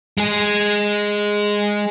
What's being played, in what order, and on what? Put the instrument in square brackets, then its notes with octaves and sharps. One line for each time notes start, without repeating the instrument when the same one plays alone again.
[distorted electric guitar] G#3 G#4